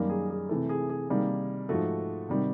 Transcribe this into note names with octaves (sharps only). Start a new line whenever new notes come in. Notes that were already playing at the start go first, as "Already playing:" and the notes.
Already playing: F#2 D#3 G3 A#3
G#4
G#4
C3 E3 A3
G#4
G#4
C3 D#3 G3 A#3
G#2 F3 A3 F#4
C3 D#3 G3